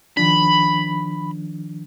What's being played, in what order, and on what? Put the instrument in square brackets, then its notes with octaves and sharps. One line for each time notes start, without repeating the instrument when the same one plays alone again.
[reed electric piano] D#3 F3 D4 [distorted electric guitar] B5